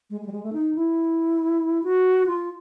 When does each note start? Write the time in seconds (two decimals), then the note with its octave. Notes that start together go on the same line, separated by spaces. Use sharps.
0.10 G#3
0.21 G#3
0.27 G3
0.32 G#3
0.43 A3
0.53 D#4
0.75 E4
1.84 F#4
2.26 F4